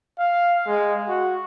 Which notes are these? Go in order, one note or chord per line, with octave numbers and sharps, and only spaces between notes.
F5
G#3
F#4